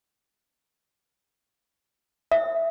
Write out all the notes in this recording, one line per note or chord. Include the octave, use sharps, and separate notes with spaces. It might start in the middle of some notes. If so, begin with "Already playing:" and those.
E5